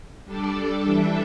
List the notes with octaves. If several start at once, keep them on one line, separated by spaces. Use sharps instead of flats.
G3 D4 A4 D5
E3 G3 D4 A4 E5